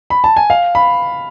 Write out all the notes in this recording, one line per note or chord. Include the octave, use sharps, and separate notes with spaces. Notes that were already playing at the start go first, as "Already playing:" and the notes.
B5
A5
G#5
F5
B5